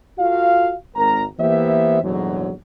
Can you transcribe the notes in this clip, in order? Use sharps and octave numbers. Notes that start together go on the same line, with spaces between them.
F4 F#4 A4 F5
G#1 A#4 A#5
E3 A#3 B3 G4 C5 E5
A#1 E2 G#2 D3 F#3